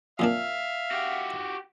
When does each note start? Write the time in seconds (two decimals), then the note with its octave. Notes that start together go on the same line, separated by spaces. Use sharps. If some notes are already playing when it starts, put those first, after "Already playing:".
0.19 F2 A#2 D4 E5 F5
0.91 F#4 G4